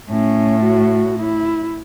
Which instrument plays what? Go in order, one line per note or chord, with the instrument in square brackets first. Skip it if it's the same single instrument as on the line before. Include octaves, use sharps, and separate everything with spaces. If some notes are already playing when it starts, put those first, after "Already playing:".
[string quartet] A2 [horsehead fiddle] C#4
[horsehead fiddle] F#4
E4